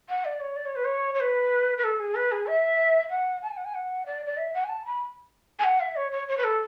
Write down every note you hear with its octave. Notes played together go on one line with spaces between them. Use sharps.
F#5
D5
C#5
D5
C#5
B4
C#5
C#5
B4
B4
A4
G#4
B4
G#4
E5
F#5
A5
G#5
F#5
G#5
F#5
D5
D5
E5
F#5
G#5
A5
B5
G#5
F#5
E5
C#5
C#5
C#5
B4
A4